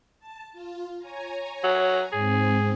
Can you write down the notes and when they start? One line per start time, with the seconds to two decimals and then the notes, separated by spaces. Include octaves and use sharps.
0.19 A5
0.53 F4
0.99 C#5 G#5 A#5
1.64 F#3
2.12 G#2 C4 G#4